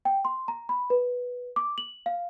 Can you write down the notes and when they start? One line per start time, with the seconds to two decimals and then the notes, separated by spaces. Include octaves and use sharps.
0.05 G5
0.25 C6
0.48 A#5
0.69 B5
0.90 B4
1.56 D6
1.78 F#7
2.06 F5